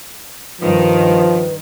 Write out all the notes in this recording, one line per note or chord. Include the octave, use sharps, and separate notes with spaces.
G2 D#3 F3 B4